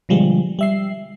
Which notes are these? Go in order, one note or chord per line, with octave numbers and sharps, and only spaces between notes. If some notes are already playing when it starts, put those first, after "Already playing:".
B2 D3 F3 G3 G#3
G3 E5 C7